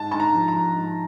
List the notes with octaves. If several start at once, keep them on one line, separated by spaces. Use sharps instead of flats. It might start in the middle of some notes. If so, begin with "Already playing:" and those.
Already playing: G#2 A5
G#2 A5
A#5
F3
A#5
F3
G#2